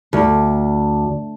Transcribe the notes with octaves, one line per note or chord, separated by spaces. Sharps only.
D2